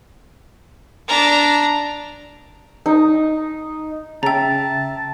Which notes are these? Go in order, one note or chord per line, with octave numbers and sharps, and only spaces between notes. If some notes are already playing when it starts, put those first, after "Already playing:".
D4 A#5
D#4
C#3 E5 G5 A5 A#5